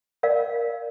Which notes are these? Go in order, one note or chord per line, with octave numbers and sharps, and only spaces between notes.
A#4 D5 F5